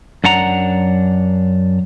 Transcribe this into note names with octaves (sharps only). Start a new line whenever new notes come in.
F#2 D4 F#5 A#5